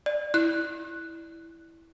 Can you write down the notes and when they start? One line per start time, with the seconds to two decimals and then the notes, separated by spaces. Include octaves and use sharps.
0.06 D5
0.34 E4 F#6